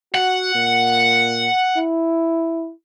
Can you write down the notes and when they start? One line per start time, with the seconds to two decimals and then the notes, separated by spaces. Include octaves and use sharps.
0.14 F#4 F#5
0.55 A#2
1.77 E4